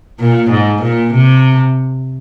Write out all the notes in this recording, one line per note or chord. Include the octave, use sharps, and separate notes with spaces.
A#2
G#2
A#2
C3